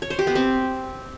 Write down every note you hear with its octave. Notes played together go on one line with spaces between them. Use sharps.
C#5
C5
G4
B3
C4